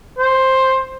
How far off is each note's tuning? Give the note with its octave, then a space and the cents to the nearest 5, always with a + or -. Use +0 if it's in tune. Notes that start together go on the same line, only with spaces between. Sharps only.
C5 +10